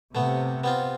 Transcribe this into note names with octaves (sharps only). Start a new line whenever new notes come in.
C3 A3 B3
B3 C4 F4